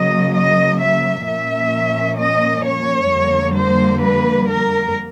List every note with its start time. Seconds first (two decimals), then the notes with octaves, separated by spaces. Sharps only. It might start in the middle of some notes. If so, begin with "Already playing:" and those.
Already playing: C#3 F#3 A#3 D#5
0.35 D#5
0.81 E5
1.26 A#2 F3 A#3 C#4 E5
2.18 D#5
2.65 C#5
3.11 F2 D3 G3 A#3
3.56 C5
4.02 B4
4.49 A#4